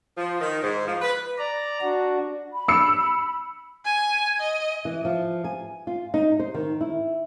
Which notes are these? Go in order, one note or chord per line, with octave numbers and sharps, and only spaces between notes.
F3
D#3
G#2
F3
B4
D5 A#5
D4 F#4
B5
E6 C#7
G#5
D#5
E3
F3
G#5
F4
D#4
C5
D#3
E4